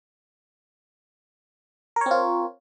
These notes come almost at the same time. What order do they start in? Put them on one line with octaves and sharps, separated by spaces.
A#4 C#5 C4 F4